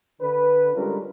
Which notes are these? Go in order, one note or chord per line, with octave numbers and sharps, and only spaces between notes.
D3 B4
D3 G3 G#3 C#4 F4 A#4